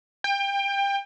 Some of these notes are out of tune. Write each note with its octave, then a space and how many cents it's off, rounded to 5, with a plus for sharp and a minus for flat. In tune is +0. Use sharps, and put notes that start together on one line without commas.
G5 +25